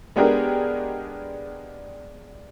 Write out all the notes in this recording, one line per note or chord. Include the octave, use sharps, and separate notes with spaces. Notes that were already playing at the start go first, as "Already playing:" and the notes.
G#3 B3 D4 G4 G#4 A#4